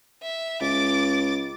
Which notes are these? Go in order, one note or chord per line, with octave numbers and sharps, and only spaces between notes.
E5
C#2 D6 A6